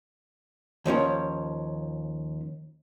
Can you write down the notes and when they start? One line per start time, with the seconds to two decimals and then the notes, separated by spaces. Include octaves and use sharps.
0.85 D#2 F3 C#4 C#5